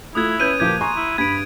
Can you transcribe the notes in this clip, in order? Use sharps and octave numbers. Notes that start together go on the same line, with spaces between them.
A3 E4 F4 D#6 F#6 G#6
C#4 B4 G6 D#7
A#2 F3 A#3 G4 G#6
G#5 A#5 C6 C#6
E4
G2 B5 G#6 D7